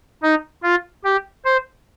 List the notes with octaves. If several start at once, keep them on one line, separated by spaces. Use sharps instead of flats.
D#4
F4
G4
C5